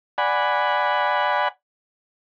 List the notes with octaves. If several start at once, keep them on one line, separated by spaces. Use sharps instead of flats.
D5 F#5 G#5 B5